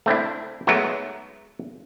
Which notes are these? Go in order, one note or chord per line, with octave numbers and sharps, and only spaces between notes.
A3 C4 D4 E4
F#3 G#3 A3 B3 D#4 F#4